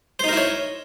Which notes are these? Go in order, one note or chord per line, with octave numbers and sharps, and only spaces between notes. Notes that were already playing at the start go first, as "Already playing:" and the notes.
D#4 E4 A#4 C5 C#5